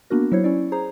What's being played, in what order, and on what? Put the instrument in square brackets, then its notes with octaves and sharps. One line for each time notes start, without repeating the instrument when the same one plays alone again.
[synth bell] A#3 B3 D4 F#4 A#4
F#3 E4 C5 C#5
C#4 E4 D5
G#4 C5 A#5